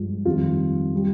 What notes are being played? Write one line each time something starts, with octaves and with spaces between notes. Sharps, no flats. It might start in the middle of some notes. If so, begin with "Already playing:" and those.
Already playing: G2 F3 G#3
F2 D#3 G3 F4
G3